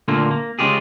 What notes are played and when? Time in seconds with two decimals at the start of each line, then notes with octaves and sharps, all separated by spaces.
0.08 A#2 D3 A3 A#3 F4
0.31 A#3
0.59 C#3 G#3 F4 G4 G#4